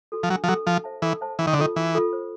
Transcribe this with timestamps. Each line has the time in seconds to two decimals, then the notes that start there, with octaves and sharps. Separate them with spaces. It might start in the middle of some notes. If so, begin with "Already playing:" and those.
0.12 F#4 A4
0.23 F3
0.29 F#3 D4
0.44 F3
0.48 F#3 F#4 A4
0.67 F3 A4
0.84 C5 E5 A5
1.02 E3 A4
1.21 C5 E5 A5
1.39 E3 C#4
1.47 D#3
1.53 D3
1.58 D#3 F4 A4
1.76 E3 C#4
1.95 F4 A4
2.13 C5